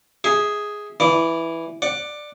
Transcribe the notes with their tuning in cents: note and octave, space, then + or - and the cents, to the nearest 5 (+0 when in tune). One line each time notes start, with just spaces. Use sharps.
G#4 +0 E5 -25
E3 +0 D5 +20
D5 +15 F#5 +0